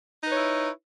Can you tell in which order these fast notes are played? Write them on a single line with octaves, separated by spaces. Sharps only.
D#4 B4 C#5 E4